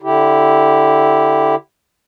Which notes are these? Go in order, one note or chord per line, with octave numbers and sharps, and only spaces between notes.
D3 E4 G4